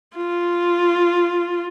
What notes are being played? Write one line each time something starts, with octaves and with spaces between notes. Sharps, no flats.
F4